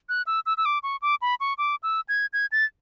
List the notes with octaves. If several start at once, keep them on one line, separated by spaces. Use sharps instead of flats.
F#6
E6
E6
E6
D6
C#6
D6
B5
C#6
D6
E6
G#6
G#6
A6